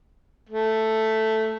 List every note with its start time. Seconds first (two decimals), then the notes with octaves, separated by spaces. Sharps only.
0.49 A3